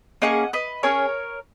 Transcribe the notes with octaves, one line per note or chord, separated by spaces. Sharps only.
A#3 C#4 G#4 D#5 F#5
B4 D#5
C#4 G#4 A#4 C#5